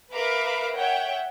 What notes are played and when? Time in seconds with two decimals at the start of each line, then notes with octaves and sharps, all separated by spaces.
0.13 A#4 B4 E5 F5 B5 D6
0.76 C#5 E5 F#5 G5